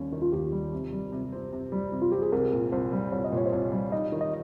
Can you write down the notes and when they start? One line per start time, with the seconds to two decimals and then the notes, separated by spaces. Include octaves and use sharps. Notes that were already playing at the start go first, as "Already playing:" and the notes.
Already playing: D#2 D#3 G3 C#4
0.12 D#3
0.22 F4
0.33 D#2 G4
0.52 G3
0.73 C3
0.92 G3
1.12 C3
1.33 C4
1.52 C3
1.72 G3
1.92 C3
2.02 F4
2.12 C4 G4
2.22 G#4
2.32 C2 A#4
2.53 A#2
2.72 C2 C5
2.92 G3
3.12 C2 C#5
3.24 D#5
3.32 A#2 C#5
3.46 C5
3.52 C2 C#5
3.72 G3
3.92 D#4 D#5
4.12 D#3
4.21 D#5